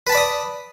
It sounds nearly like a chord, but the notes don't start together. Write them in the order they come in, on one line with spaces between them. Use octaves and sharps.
B4 A5 B5 D5 D#6